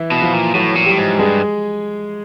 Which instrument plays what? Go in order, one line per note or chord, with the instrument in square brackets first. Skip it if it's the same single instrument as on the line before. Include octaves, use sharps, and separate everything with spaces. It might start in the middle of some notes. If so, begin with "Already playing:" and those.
Already playing: [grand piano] E3 E4
[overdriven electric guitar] B2
[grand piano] F3 F4
[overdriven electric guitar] A#2
[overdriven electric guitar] A2 [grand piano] F#3 F#4
[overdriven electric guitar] A#2
[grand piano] G3 G4
[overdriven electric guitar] A2
G#2
[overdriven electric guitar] G2 [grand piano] G#3 G#4